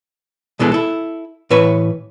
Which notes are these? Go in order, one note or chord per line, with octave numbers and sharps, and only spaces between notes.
C2 B2 E3 G#3 G4 A4
E4 A4
A2 E3 B4 C#5